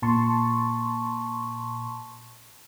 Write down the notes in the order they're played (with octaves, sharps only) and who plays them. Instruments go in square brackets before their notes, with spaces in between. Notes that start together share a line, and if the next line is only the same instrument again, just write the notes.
[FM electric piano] A#2 A5 C6 C#6